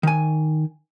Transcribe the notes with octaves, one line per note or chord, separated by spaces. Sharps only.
D#3 G#5